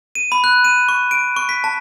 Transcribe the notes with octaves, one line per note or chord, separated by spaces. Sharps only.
D#7
B5
F#6
D#7
C#6
D7
C#6
B6
A5